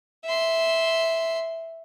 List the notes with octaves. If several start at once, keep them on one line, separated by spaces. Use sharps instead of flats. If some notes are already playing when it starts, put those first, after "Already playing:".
E5 C6